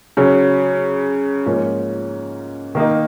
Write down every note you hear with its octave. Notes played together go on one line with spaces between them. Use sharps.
C#3 F#3 C#4
G#2 F3 A#3 C#4
D#3 A#3 D#4